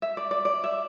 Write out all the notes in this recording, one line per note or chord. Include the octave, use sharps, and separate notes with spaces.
E5
D5
D5
D5
E5